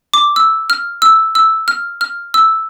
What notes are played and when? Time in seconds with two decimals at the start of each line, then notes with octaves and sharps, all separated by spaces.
0.14 D6
0.36 E6
0.70 F6
1.02 E6
1.35 E6
1.68 F6
2.01 F6
2.34 E6